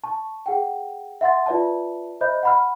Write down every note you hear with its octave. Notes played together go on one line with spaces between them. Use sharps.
A5 C#6
G#4 F#5 G5
E5 F#5 C6 A6
F4 B4 D5 E5 A5
C5 D#5 E5 B5 G6
F#5 B5 F6